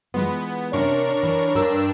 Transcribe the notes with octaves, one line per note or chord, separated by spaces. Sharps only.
E3 G#3 B3 F4
C3 C#4 D4 A#4 C#5 C#6
E3
G2 D4 A#4 E6